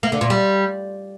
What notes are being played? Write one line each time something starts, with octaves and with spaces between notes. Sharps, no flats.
A#3
D3
A#2
G3